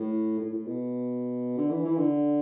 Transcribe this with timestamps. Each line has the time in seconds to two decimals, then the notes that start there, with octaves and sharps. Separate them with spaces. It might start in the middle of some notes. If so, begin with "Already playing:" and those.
Already playing: A2
0.39 A2
0.52 A2
0.66 B2
1.57 D3
1.70 E3
1.84 E3
1.97 D3